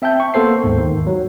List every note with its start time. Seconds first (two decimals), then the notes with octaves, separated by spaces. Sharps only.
0.02 C4 E5 G5 A5 G6
0.20 C#6
0.34 A#3 B3 A4 C5 C7
0.64 D#2 G#2
0.78 D#3
1.07 F#3